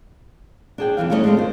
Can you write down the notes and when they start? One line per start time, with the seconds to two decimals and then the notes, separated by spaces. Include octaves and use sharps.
0.78 D4 G#4 G5
0.97 F2 G#2 E3 F5
1.10 G3 A3 C#4 E4 D5 D#5
1.24 G#3 A3 C4 D4 F4
1.37 D#3 G#3 C5